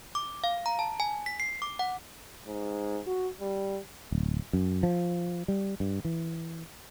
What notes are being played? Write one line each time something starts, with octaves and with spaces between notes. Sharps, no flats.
D6
F5
A#5
A5
G#5
B6
C7
D6
F#5
G#2
F#4
G3
D1
F#2
F3
G3
G2
E3